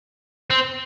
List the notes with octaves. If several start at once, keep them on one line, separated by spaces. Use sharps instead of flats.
C4